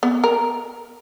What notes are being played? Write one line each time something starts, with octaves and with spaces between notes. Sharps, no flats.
B3
A#4